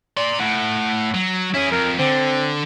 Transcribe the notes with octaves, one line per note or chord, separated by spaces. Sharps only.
D5 A#5 C6
A2 F#5
F#3
C#4 E4 G#4
F2 A#4
D3 C4